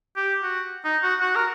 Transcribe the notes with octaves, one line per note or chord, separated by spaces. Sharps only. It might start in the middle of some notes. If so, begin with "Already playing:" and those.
G4
F#4
D#4
F#4
F#4
A#4